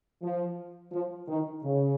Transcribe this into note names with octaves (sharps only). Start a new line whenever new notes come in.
F3
F3
D#3
C#3